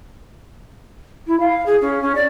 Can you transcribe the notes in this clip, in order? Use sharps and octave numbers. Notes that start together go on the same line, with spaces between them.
E4
F5
G#4
C#4
C#4
D5